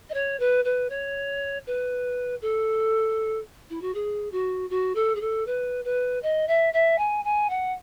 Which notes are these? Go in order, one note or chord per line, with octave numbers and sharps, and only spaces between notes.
D#5
C#5
B4
B4
C#5
B4
A4
E4
F#4
G#4
F#4
F#4
A4
G#4
A4
B4
B4
D#5
E5
E5
G#5
G#5
F#5